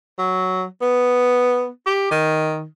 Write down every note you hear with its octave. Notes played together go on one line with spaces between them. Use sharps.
F#3
B3
G4
D#3